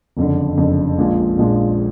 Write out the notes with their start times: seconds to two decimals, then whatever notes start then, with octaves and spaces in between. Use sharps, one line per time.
0.17 F#1 F2 D3
0.57 F#1 F2 D3
0.98 A#1 A#2 F3 G#3
1.38 A#1 A#2 F3 G#3